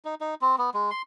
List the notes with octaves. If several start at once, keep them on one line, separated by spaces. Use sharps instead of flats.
D#4
D#4
C4
B3
G#3
C6